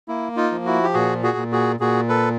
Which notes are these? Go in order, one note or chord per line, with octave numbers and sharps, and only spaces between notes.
A#3 E4
D#4 F4
F3
E4 F#4
G4
A#2 F#4 G#4
F#4 G#4
A#2
F#4 G#4
A#2 F#4 G#4
A4 B4